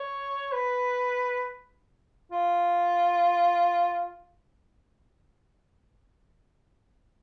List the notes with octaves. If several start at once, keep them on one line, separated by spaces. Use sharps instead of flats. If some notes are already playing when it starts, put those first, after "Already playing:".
Already playing: C#5
B4
F4